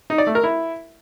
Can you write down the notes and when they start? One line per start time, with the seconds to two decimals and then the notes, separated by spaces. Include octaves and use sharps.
0.10 D#4
0.18 D5
0.27 A3
0.35 A#4
0.44 E4